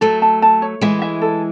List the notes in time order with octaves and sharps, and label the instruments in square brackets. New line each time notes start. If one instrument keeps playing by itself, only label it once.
[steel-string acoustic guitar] F#3 A3 [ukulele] A4
[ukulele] A5
A5
C#5
[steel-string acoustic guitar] E3 G#3 [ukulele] E5
[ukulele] E5
A4